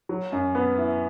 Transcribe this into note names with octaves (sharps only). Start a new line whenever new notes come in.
F#3
F#2
B3
E4